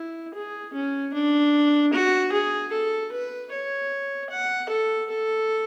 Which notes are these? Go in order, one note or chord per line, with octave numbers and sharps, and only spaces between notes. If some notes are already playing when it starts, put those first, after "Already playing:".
Already playing: E4
G#4
C#4
D4
F#4
G#4
A4
B4
C#5
F#5
A4
A4